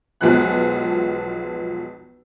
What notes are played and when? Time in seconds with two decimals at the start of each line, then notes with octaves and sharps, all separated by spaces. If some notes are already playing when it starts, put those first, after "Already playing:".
0.21 B1 E2 F3 G#3 B3 F#6